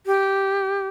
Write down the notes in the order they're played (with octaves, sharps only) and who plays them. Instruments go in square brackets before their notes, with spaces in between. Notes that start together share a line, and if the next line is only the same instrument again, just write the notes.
[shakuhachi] G4